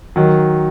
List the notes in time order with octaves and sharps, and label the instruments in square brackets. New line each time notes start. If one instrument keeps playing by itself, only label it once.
[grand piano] D#3 F#3